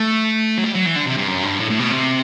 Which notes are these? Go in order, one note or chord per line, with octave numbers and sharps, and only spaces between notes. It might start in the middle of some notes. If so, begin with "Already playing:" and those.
Already playing: A3
F#3
G3
F#3
E3
D3
C3
G2
F#2
G2
A2
A2
B2
C3